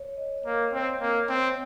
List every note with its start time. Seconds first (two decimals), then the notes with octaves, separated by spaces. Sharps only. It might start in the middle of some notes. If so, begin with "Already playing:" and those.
Already playing: C#5
0.17 D#5
0.38 D#5
0.45 A#3 F5
0.72 C4
1.01 A#3
1.29 C4